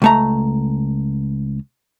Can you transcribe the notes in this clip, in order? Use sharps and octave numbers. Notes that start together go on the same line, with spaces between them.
C#2 A3 A#5